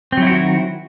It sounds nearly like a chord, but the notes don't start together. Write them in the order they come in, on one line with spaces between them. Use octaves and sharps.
C4 F#3 E4 F#4 D#3